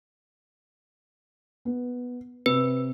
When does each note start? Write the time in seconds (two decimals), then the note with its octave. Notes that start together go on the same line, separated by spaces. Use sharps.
1.65 B3
2.46 C3 B4